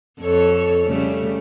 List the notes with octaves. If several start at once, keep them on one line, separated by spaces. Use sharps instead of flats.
F2 A4 C#5
C#3 G3 A3